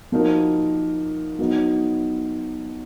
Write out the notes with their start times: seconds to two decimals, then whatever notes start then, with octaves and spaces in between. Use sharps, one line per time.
0.12 F3 A#3 D#4 F#4 A#4
1.39 F#3 B3 D#4